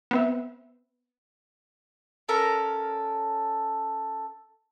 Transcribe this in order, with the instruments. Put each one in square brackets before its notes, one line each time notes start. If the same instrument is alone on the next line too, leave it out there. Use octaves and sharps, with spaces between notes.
[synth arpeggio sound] B3 C4 E5
[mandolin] C#4 A4 A#4 A#5